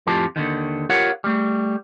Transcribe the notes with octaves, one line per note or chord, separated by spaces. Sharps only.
F2 A2 F3 F4 G4 A5
D#2 B2 D3 D#3
F4 G4 A#4 C#5 F5 F#5
G3 A3